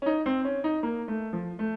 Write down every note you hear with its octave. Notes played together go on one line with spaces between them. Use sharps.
C#4
D#4
C4
C#4
D#4
A#3
A3
F3
A3